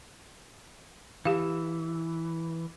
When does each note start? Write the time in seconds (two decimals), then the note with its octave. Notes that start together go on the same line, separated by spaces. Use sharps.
1.25 E3 G4 F5